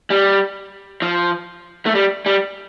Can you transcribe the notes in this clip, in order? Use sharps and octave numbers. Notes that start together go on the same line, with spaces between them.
G3
F3
A3
G3
G3